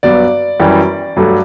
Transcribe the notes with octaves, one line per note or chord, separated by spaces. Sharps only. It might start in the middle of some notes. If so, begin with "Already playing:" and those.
G2 F#3 B3 D5
F#2 E3 G3
G2 F#3 A3